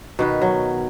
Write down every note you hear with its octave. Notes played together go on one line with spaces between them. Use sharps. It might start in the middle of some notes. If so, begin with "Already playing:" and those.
B2 D#3 B4
F#3